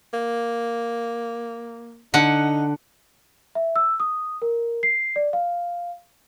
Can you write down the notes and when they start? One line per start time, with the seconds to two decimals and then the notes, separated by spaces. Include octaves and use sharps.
0.14 A#3
2.14 D3 D#4 F#5
3.55 E5
3.76 E6
4.00 D#6
4.42 A#4
4.83 C7
5.16 D5
5.33 F5